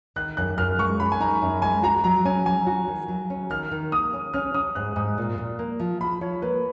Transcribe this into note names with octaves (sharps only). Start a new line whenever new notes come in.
D#3 F#6
F#2 F#6
F#2 F6
G#3 C#6
F#2 B5
G#5
D#4 A#5
F#2
G#3 G#5
F#4 A#5
F#3 A#5
C#4 G#5
F#3 G#5
F#4
D#3
F#3
C#4
D#3 F6
D#3
A#3 D#6
C#4
C#4 F6
C#4 D#6
G#2 F#6
G#2 D#6
A#2
A#2
A#3
F3
F3 B5
F3 C#5
A#3 B4